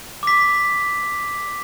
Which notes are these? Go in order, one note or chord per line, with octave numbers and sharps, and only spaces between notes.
D6 B6